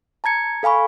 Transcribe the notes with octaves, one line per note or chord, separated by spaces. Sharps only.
A5 A#5 G#6 C#7
A4 F5 G#5 B5 C#6